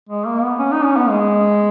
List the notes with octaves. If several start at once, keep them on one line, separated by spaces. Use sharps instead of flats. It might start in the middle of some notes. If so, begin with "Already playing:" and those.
G#3
A#3
B3
C#4
D#4
C#4
B3
G#3